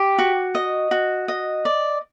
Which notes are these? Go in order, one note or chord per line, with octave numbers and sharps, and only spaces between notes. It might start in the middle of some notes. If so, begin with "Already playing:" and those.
Already playing: G4 G5
F#4
D#5
F#4
D#5
D5